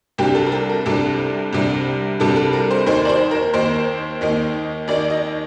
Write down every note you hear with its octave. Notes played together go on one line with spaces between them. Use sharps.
C2 C3 G3 D4 G4
A4
A#4
A4
A#4
C2 C3 G3 D4 A4
C2 C3 G3 D4
C2 C3 G3 D4 A4
A4
A#4
C5
D#2 D#3 A#3 D#4 C5
D5
C5
A#4
D#2 D#3 A#3 D#4 C5
D#2 D#3 A#3 D#4
D#2 D#3 A#3 D#4 D5
D#5